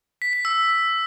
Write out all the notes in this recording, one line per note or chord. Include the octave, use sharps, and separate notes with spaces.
B6
B6
E6